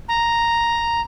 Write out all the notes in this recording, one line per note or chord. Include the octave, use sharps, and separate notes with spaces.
A#5